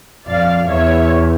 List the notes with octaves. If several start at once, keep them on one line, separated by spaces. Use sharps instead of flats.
F2 D5 F5
E2 C#5 E5